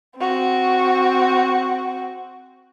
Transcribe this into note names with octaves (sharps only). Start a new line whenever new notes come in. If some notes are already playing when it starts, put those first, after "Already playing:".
C4 F#4